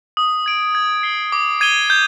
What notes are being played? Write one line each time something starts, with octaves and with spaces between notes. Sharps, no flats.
D#6
G#6 D7
G#6
C7 G7
D6
G#6 D#7 G7
G6